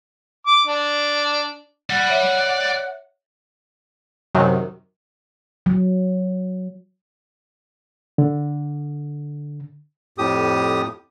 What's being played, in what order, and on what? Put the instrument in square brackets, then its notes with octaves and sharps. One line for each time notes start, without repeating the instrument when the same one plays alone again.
[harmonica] D6
D4
[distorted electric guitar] D5 B5 [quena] F#5
[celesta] C#5 E5
[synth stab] F#2 C3 D#3 [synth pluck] F#3
[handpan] F#3
[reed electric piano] D3
[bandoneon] F2 A2 G4 D#6